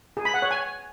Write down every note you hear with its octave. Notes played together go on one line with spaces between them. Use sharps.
G#4
B5
F#5
C#5
G#5